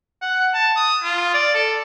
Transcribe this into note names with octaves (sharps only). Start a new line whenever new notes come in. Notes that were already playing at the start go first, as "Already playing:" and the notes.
F#5
A5
D#6
F4
D5
A4